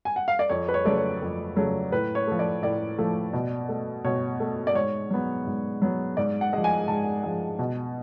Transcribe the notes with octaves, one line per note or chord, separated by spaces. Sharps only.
G#5
F#5
F5
D5
F2 C#5
B4
C#5
C#3 F#3 A3 D5
C#5
F2
C#3 F#3 A3
A2 B4
C#5
F3 A3
D5
A2 D5
F3 A3
B2
A3
B2 C#5
A3
D5
G#2 C#5
F#3 B3
G#2
F#3 B3
G#2 D5
F#5
F3 G#3
G#5
G#2 A5
F3 G#3
B2